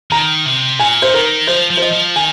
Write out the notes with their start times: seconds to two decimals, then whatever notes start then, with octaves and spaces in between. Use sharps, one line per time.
0.11 D#3 A#5
0.46 C3
0.79 A#2 G#5
1.02 C5
1.13 D#3 A#4
1.47 F3 C5
1.70 F3
1.77 C5
1.82 D#5
1.93 F3
2.16 D#3 G#5